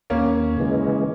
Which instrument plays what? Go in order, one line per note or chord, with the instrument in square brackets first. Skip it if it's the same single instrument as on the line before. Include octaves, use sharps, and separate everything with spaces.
[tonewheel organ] D#2 [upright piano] A#3 C#4
[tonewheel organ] C#3 E3 G#3